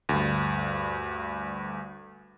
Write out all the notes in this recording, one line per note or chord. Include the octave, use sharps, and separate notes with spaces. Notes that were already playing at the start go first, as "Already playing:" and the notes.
D2 G2